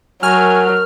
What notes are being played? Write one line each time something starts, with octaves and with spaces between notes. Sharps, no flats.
F#3 A3 A#4 G#5 F6